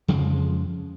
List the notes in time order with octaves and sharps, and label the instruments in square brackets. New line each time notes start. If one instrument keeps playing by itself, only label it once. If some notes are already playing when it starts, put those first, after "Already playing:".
[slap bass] F2 C#3 F3 G#3